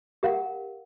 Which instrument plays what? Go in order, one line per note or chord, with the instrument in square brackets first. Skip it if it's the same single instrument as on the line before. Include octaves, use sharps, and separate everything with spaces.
[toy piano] G4 A#4 F5 F#5